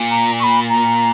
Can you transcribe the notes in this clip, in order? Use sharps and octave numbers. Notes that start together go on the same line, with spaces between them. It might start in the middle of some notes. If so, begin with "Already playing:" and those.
Already playing: A#2
A#5
C#6
B5
A#5